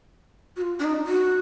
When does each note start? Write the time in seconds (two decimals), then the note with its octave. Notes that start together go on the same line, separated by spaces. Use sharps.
0.56 F#4
0.62 F4
0.80 D4
0.84 D#4
1.07 F#4